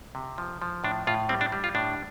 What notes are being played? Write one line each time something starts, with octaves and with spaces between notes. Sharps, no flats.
C3
F3
F3
A2 D4
A2 F4
G3 C4
D4
G3
F4
A2 D4